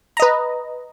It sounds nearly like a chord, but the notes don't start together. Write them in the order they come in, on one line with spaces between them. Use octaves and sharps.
A#5 D#5 B4